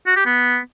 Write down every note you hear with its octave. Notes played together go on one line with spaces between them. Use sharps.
F#4
G4
B3